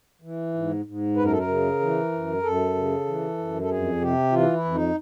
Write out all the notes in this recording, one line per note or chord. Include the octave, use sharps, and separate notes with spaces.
E3
G#2
G#2
F#2 B4
A#4
A4
A#4
C#3
E3
F#2
F#2 A4
C#3
E3
F#2
A4
F2 G#4
C3 G4
E3 F4
E4
F2
D#4